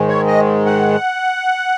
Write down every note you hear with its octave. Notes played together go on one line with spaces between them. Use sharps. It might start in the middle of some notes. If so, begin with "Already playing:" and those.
Already playing: G#2 D#3 G#3
C#5
D#5
F#5